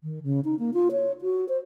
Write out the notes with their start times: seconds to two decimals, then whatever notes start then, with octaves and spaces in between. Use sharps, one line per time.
0.03 D#3
0.23 C#3
0.45 D#4
0.59 A#3
0.74 F4
0.92 C#5
1.22 F#4
1.49 C5